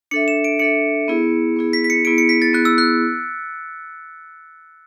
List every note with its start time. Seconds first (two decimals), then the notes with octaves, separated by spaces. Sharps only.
0.11 D4 A4 E5 C#7
0.28 E7
0.44 D7
0.59 D4 A4 E5 C#7
1.08 B3 E4 G#4
1.56 B3 E4 G#4
1.73 B6
1.84 B6
1.90 C#7
2.05 B3 E4 G#4 D7
2.18 C#7
2.29 B6
2.42 A6
2.53 B3 E4 G#4 F#6
2.65 E6
2.78 F#6